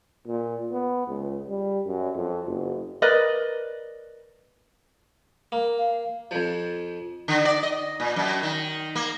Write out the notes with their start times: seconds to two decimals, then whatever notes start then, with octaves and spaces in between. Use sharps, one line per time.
0.27 A#2
0.72 B3
1.08 C#2
1.48 G3
1.86 F#2
2.15 F2
2.46 F#1
3.02 A#4 B4 D5 D#5
5.52 A#3
5.78 F5
6.31 F2 F3
7.28 D3
7.45 D5
7.63 D#5
8.00 A#2
8.16 F#2
8.43 D#3
8.95 A#3